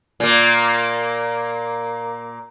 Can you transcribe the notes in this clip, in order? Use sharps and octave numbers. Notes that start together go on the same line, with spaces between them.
A#2 A#3